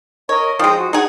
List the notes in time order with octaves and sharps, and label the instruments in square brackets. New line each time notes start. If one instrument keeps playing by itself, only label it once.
[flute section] A#4 D#5 [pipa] C#5
[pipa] F3 G#3 [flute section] D#4 G5 D#6
[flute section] F#4
[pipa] D#4 G#4 [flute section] F#5